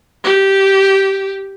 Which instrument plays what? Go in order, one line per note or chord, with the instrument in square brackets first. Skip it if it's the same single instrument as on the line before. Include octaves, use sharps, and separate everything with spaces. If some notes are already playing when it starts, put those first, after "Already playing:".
[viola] G4